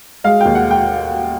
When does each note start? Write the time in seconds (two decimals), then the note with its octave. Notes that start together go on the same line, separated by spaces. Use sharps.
0.24 G#3 F5
0.40 D#2 G5
0.55 F#5
0.71 G5